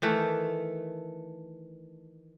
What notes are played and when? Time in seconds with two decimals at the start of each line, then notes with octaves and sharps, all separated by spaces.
0.02 D#3 E3 A3